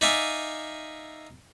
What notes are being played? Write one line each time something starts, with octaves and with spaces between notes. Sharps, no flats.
D#4 D5 E5 F5 G#5